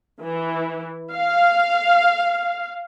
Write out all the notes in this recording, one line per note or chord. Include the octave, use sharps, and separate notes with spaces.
E3
F5